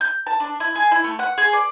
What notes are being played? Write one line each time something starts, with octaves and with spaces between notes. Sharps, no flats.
G6
A5
D4
E4
G#4
E4
A3
F#5
G#4
D5